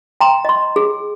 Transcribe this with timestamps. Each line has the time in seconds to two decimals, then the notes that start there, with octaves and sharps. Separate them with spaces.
0.21 G5 A#5 C6
0.45 D#5 C6
0.76 G#4